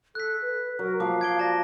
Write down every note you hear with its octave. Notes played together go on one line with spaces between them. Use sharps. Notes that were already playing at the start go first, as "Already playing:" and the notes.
A4 F#6 B6
B4
F#3 A#4
F3 A#3 A#4 F5 D6
F5 G#6 D7 G7
D5 A5 A#6